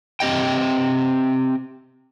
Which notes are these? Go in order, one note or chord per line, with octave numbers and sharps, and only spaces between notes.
C4 G4 D#5 G5